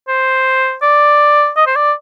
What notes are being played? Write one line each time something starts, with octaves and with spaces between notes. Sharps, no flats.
C5
D5
D#5
C5
D5